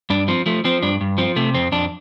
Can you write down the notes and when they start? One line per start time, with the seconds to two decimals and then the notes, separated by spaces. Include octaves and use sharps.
0.10 G2 D4
0.28 F3 C4
0.46 F3 A3
0.64 F3 C4
0.83 G2 D4
1.01 G2
1.18 F3 C4
1.36 C3 A3
1.54 F2 C4
1.72 F2 D4